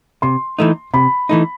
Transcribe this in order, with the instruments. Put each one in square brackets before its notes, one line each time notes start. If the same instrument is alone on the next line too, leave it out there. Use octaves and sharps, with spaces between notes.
[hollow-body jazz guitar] C3 [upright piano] C6
[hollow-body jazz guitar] E3 A3 D#4
[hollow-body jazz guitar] C3 [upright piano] B5
[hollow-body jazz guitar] E3 A3 D#4